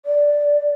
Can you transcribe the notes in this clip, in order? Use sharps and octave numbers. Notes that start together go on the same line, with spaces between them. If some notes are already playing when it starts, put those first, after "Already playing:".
D5